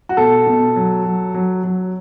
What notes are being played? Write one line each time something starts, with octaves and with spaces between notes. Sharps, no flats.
F#4
B2 A4
B2
F#3
F#3
F#3
F#3